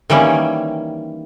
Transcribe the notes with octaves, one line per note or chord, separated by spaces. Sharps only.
D#3 E3 G3 A#3 C#4